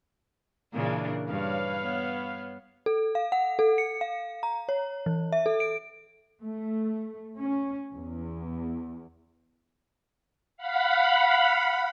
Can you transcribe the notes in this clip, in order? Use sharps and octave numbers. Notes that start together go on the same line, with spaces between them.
A#2 C#3 E3 D4 A#4
G2 B4 C#5 F5
B3
A4
F5
F#5
A4
C#7
F5
A#5
C#5
E3
E5
A4
D7
A3
C#4
E2
F5 F#5 B5